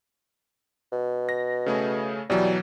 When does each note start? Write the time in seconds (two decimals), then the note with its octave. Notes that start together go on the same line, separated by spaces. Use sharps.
0.92 B2
1.29 A#6
1.66 C#3 A3 G#4
2.30 B2 E3 F#3 G3